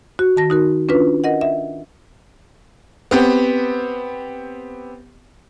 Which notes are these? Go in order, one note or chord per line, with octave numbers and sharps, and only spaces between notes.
F#4
D#3 A5 A#6
D#4 F#4 A#4
C#4 D4 F4 B4
A#4 D#5 F#5
E5
B3 C4 G4